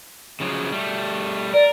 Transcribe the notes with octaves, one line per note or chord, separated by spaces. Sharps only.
C#3 F3 F#3
G3 A3
A#4 D5